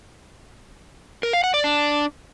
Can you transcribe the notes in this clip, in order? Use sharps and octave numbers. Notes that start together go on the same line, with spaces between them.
A#4
F5
F#5
D5
D4